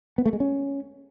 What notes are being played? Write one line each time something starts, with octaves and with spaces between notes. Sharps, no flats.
B3
A3
G#3
C#4